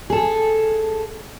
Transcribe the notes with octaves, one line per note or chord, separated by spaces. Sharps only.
G#4 A4